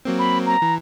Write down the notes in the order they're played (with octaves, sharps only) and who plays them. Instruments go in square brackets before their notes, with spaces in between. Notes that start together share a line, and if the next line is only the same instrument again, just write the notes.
[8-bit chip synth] F#3 A#3 C4
[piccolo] B5
A#5
[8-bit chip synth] E3